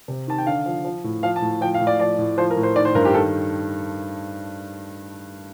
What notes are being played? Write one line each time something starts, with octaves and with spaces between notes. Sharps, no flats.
C3
D#3 A5
G5
D3 F5
F3
F3
A2
F3 F5
A5
A2
F3 G5
F5
A2
D5
F3 D5
A2
F3 C5
A#4
A2
C5
D#3 D5
C5
G2 A#4
G4
D#3 A4